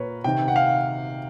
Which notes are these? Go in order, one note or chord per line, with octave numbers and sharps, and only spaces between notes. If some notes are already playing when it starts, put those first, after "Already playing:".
Already playing: A#2 A#4 B4 C#5
C3 D#3 G5
F#5
F5